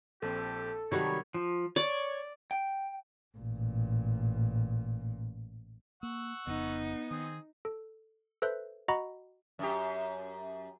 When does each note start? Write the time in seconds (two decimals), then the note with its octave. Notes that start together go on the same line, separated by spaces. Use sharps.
0.22 A#1 C4 G4 A4
0.92 C3 D#3 F#3 G3 F#4 C#5
1.34 F3
1.76 C#5 D5
2.51 G5
3.38 A1 A#2
6.03 A#3 F#5 C#6 E6
6.47 F1 F2 C#3 B3 D#4
7.11 D#3 C4 G#4 D#6
7.65 A4
8.42 A4 B4 C5 E5 F#6 G6
8.88 F#4 D#5 F#5 A#5 B5 C#6
9.59 F#2 G4